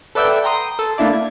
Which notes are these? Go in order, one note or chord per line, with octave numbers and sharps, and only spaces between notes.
A4 B4 D5 E5 F#5 G5
G5 A#5 C6 D#6
A4
A3 A#3 D4 E4 D5
G#6